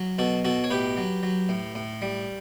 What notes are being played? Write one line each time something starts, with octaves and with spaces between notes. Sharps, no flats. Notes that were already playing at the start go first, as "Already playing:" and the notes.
Already playing: F#3
B2 F#4 A4
B2 F#4 A4
C#5
A2 G4 B4
F#3
F#3
A2
A2
G3